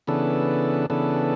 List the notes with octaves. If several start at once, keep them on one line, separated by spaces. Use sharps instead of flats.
C#3 E3 B3 D4 A4
C#3 E3 B3 D4 A4